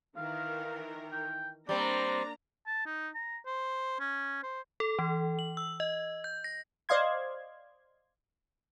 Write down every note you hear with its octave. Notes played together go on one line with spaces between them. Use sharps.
D#3 E3 A#4 F5
G5
G3 A#3 C4 D4 D5 A#5
A5
D#4
A#5
C5
C#4
C5
A4
E3
F#7
E6
D#5
G6
A#6
C5 D5 D#5 F5 C6 G#6